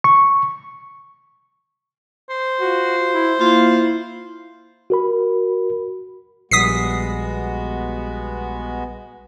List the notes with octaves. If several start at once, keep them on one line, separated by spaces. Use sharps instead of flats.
C#6
C5
F4 F#4
E4
A#3 E4 F4
F#4 A#4 B5
A#1 G3 G#3 B3 F#4 D#6 B6 C7